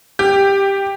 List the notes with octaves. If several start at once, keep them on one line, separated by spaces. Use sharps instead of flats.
G4